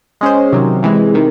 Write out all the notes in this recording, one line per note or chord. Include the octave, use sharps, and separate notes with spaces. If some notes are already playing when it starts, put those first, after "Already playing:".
G#3 C#4 G#4 C5
C3 D#3 F#3
C3 E3 G#3
C3 D#3